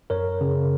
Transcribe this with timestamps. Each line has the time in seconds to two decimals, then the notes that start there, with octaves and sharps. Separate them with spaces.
0.10 F#2 A#4 C#5
0.41 C#3